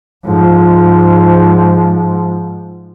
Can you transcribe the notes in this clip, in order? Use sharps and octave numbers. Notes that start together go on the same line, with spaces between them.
G#2 F3